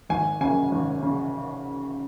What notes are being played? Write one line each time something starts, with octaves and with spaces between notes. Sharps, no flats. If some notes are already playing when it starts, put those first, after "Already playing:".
G#1 G#5
F#2 C#3 G#5
G#1
C#3